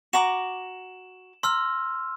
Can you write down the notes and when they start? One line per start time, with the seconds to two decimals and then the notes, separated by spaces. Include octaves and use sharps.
0.13 F#4 A#5 D6 E7 F#7
1.43 A#5 C6 E6 F6